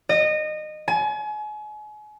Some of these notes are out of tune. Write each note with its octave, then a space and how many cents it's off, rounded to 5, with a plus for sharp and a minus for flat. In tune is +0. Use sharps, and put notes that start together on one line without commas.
D#5 -25
G#5 +35